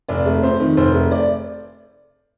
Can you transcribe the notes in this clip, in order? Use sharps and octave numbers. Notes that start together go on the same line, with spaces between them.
F1 D5
A3
F2 C5
D#3
F1 C5
A3
D5